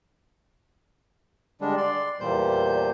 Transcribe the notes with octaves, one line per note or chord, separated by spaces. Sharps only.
D3 G3 G#3 D4
D5 C6
E2 A#2 G3 C5 G6